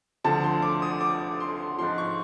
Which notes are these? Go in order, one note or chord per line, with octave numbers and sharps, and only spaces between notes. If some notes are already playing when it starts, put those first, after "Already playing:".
D2 D3 F3 A5
C6
D6
D#6
D6
C6
G#2 F3 C6
C#6